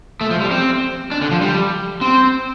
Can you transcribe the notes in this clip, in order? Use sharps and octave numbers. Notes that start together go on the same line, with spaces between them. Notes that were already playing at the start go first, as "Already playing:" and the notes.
A3
F3
G3
C4
D4
D3
F3
G3
C4